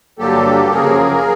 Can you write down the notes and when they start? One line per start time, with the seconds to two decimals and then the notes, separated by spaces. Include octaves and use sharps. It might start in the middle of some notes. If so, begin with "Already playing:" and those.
0.19 G2 D3 F#3 A#3 G4 A4
0.72 F#2 C#3 F3 A#3 G#4 A#4